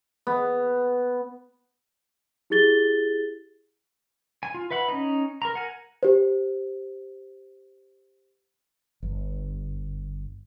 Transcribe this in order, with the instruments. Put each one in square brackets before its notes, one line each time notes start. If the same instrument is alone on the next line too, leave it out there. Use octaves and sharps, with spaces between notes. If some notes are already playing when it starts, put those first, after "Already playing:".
[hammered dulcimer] B3
[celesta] E4 G4 G#4 A6 G7
[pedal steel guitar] G#5
F4
B4 E5 F#5 B5
C#4 D#4
A#4 A#5
A#4 F#5 G#5
[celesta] G4 C5
[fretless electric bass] G1